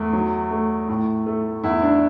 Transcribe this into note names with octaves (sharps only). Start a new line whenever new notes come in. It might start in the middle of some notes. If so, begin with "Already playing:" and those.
Already playing: E2 A3
F#3
A3
A2
A3
E2 E4
D4